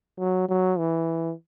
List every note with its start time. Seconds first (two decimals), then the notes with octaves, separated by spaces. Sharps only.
0.19 F#3
0.49 F#3
0.79 E3